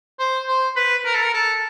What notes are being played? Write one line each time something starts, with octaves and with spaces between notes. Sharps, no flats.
C5
C5
B4
A#4
A4
A#4
A4